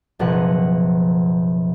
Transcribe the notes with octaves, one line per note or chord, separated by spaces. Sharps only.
F#1 B2 F3 F#5